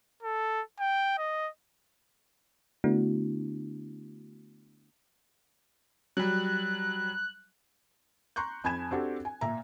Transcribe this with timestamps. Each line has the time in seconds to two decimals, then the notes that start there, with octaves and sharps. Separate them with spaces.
0.23 A4
0.80 G5
1.18 D#5
2.84 D3 A3 B3 D4 E4 F#4
6.17 F#3 G3 F#6
8.36 A#5 C6 C#6 F#6 G6
8.64 F2 G#5 B5 G#6 E7
8.91 C4 D4 F#4 G4 A4
9.25 G#5
9.41 A#2 E5 A#5